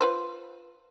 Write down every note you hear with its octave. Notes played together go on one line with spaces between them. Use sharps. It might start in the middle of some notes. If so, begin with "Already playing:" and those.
F4 B4 C5